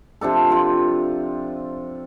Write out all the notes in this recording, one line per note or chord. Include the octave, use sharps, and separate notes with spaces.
C3 F3 D4 A4
C4 F4